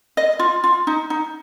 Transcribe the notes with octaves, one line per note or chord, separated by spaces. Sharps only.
D#5
F4
F4
D#4
D#4